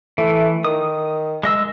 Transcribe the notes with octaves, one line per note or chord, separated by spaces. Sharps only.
E3 A3
D#3 D#6
G#3 D#5 E6